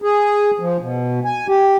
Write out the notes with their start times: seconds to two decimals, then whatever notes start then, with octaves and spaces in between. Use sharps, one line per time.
0.02 G#4
0.60 F3
0.81 B2
1.25 G#5
1.48 G4